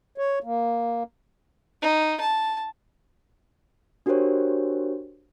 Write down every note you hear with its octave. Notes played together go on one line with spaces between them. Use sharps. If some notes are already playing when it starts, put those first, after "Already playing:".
C#5
A#3
D#4
A5
D4 F#4 G4 A#4 C5 C#5